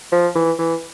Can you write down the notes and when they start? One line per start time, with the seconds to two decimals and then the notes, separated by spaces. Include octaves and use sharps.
0.12 F3
0.35 E3
0.59 E3